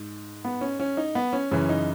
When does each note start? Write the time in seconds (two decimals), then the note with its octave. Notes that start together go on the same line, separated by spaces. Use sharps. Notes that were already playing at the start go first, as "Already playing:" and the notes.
Already playing: G#2
0.45 B3
0.61 C#4
0.80 C#4
0.97 D#4
1.15 B3
1.33 C#4
1.51 F#2 C#3 E3 C#4
1.69 D#4